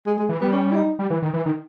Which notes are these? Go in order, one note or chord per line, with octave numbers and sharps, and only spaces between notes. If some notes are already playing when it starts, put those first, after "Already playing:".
G#3
G#3
E3
G3 B3
C#4
E4
D#4
G3
E3
D#3
E3
D#3